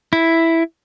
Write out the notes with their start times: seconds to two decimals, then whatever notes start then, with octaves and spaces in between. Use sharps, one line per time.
0.13 E4